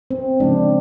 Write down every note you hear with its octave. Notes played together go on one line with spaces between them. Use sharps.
C4
C#3 F3 G#3 D4